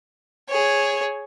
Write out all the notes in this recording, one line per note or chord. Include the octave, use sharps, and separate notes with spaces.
G#4 C#5